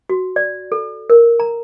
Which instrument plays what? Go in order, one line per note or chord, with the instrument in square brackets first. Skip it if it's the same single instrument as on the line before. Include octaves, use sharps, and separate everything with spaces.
[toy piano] F#4
D5
A4
A#4
A#5